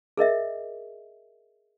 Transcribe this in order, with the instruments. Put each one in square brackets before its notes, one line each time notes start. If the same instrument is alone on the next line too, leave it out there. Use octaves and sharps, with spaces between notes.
[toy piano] G#4 A#4 D#5 E5